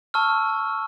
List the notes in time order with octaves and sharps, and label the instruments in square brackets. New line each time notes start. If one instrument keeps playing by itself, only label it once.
[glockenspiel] A5 C#6 E6 F6